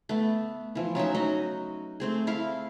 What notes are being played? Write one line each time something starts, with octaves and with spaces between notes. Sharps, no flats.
A3 B3
E3 F3
F#3 C#4 D#4 E5
D#4 F#4 D#5
A3 C4 G#4
E4 F5